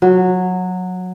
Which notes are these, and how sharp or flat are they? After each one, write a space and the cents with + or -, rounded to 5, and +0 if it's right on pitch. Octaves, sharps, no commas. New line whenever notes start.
F#3 -15